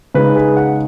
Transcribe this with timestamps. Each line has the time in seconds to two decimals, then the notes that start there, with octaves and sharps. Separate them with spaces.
0.14 C#3 G#3 D#4 B4
0.36 G#4
0.57 F#5